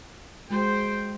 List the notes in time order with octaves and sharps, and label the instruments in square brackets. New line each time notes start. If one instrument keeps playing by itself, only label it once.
[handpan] G#3 F#4 [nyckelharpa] C5 [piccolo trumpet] G5